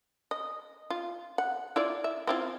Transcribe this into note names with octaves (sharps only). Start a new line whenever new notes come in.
D#5
F4
F#5
E4 F4 D5
E5
C4 E4 F4